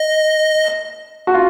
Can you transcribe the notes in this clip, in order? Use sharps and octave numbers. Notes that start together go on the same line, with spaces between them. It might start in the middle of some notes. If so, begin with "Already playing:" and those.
Already playing: D#5
F#4
F4